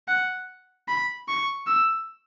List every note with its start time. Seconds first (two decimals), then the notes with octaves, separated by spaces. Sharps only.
0.08 F#5
0.88 B5
1.28 C#6
1.67 E6